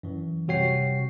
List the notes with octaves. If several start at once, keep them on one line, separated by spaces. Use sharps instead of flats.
F#2 E3
C3 G3 F#4 C#5 G5 C7